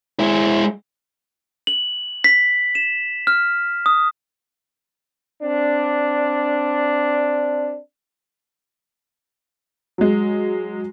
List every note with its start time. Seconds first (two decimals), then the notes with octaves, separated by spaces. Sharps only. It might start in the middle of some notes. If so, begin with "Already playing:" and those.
0.20 G#3 E4
1.67 F#7
2.24 B6
2.75 E7
3.27 F6
3.86 D#6
5.42 C4 D4
9.98 F#3 G#3